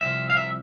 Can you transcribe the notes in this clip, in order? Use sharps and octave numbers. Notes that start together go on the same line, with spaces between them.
C2 C3 F3 E5
F5
E5